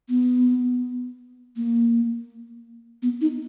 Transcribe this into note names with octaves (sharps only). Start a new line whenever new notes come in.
B3
A#3
B3
D#4